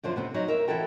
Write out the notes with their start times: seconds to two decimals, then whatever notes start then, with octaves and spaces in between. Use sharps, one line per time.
0.03 F#2 D3 F3 C5
0.16 C3 B3 C4
0.34 F#3 D#4
0.47 D#4 A#4 E5
0.68 E3 E4 F#4 A4 G5